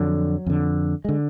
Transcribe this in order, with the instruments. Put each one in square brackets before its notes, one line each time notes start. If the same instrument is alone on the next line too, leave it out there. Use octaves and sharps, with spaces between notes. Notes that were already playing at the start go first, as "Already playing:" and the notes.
Already playing: [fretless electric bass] F2 D3 F#3
F2 D3
D3 G#3